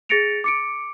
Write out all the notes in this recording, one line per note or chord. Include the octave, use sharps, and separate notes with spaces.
G#4 A6 A#6 C#7 D7 F7
D6 C#7 D7